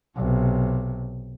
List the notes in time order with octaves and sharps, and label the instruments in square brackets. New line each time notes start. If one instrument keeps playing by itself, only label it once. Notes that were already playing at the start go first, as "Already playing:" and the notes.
[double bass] B1 C3